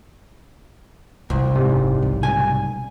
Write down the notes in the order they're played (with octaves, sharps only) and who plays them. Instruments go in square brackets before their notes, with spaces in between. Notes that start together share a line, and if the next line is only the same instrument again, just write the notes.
[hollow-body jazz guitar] C2 [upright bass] C#3
[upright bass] F#1 [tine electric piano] G#2 C3 G3
[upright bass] B1 C#3
[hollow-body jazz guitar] G#5